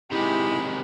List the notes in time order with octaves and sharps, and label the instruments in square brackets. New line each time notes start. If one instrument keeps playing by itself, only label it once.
[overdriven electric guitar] C3 D#3 [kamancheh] G#3 B5 [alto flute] E4 [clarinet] G4